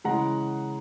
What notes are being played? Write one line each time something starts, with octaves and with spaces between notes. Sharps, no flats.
C#3 E3 G#3 F#5 A#5